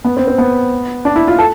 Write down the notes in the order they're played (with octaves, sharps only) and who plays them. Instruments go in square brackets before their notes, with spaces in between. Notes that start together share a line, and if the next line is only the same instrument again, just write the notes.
[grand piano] B3
C4
C4
B3
D4
E4
F4
A4